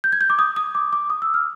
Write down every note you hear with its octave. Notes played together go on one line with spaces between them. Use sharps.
G6
G#6
G6
D6
D#6
D#6
D6
D6
D#6
E6
F6